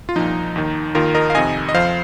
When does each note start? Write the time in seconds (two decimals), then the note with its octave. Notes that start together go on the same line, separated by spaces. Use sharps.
0.09 F4
0.16 C2 A#2 F3 D#4
0.56 D#2 D#3
0.95 D#2 D#3 F4 A#4
1.15 A#4 D#5
1.30 F5
1.35 F2 C3 D#3 D#5 G#5
1.69 D#5
1.74 F2 F3 C5 F5